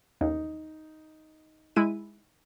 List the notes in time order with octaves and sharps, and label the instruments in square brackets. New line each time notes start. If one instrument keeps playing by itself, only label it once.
[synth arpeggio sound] D#2 [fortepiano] D#4
[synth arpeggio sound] G#3 E4 D#7